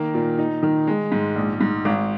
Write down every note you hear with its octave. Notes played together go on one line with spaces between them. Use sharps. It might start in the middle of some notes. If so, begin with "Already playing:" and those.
Already playing: D#3 A#3
A#2
D#4
D#3
G#3
G#2
A#1
G#2
G#1